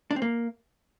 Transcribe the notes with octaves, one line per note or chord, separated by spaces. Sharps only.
D4
C4
A#3